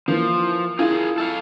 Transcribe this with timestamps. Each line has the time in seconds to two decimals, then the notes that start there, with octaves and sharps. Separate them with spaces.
0.08 E3 F3 A#3
0.79 E4 F4 G#4 A#4
1.18 A4 E5 F5